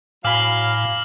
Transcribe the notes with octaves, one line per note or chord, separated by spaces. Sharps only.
A2 F#3 F5 G#5 B5 D6 F6 F#7